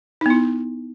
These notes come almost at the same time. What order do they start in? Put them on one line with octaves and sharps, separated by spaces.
D#4 B3 E4